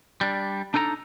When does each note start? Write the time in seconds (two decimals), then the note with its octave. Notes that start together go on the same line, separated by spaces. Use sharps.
0.21 G3 D4
0.74 D4 D#4 A4 G#5 A#5